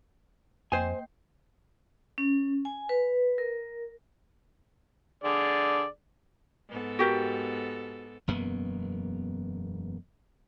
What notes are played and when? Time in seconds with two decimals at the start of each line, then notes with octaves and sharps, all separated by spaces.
0.72 F2 A#3 C5 G5 G#5 G6
2.18 C#4
2.65 G#5
2.89 B4
3.38 A#4
5.24 D3 G#4 D5
6.69 G#2 B3 A4
6.99 F#4 G4 A#4
8.27 E1 F#2 A#3 B3